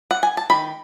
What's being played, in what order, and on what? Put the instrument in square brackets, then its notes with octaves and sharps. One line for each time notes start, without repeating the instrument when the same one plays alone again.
[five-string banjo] F#5
G#5
A5
D#3 B5